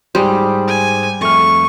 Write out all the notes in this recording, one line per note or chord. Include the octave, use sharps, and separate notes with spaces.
G#2 G3 G#4 C5
G#5
F2 A3 C#6 F6